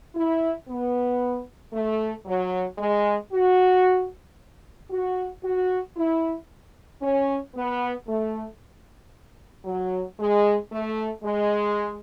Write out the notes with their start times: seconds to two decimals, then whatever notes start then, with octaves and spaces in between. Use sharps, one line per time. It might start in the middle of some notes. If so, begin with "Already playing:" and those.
0.14 E4
0.68 B3
1.73 A3
2.26 F#3
2.78 G#3
3.32 F#4
4.90 F#4
5.43 F#4
5.96 E4
7.01 C#4
7.54 B3
8.07 A3
9.65 F#3
10.19 G#3
10.71 A3
11.24 G#3